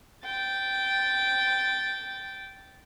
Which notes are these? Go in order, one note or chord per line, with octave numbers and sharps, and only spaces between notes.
G5 A6